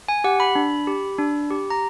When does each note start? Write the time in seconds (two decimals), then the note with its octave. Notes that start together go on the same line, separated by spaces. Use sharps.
0.08 G#5
0.24 G4 F#5
0.40 B5
0.55 D4
0.87 G4
1.19 D4
1.50 G4
1.70 A#5